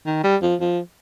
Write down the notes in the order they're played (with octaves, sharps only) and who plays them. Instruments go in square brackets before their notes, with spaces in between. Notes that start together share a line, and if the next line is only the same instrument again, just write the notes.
[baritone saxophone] D#3
G3
F3
F3